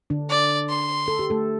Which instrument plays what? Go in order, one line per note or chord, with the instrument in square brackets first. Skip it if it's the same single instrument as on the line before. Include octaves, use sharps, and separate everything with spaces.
[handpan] D3 D4
[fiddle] D5
C6
[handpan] A4
G4
A3 A4